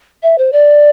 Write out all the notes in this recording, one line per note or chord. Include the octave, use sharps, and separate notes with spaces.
E5
C5
D5